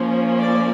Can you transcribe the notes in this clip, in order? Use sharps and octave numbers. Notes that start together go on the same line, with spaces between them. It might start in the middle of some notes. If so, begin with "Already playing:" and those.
Already playing: F3 A#3 C#4
D5